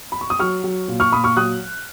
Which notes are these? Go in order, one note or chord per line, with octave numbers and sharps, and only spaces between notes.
B5
C#6
D#6
F#3 C#6 F6
F#3
A#2
C#6 F6
A#2 B5 D#6
C#6 F6
F#3 D#6 F#6